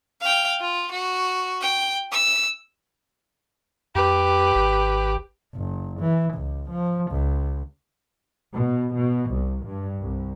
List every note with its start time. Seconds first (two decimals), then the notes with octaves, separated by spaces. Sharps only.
0.21 F5 G5
0.61 F4
0.92 F#4
1.62 G5
2.12 E6
3.95 F2 G4 B4
4.55 G#1
5.55 F#1
6.00 E3
6.34 C#2
6.70 F3
7.12 C#2
8.55 B2
8.94 B2
9.32 C2
9.65 G2
10.01 C2